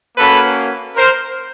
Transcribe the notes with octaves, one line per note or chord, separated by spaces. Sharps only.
A#3 C#4 F#4 A4 B4
A#4 C5